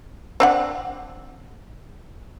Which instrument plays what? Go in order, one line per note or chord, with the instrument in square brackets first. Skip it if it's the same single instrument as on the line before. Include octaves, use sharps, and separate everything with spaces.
[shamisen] C4 D4 F#5